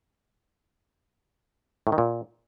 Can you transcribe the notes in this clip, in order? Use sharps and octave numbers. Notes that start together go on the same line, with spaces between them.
A2
D#3
A#2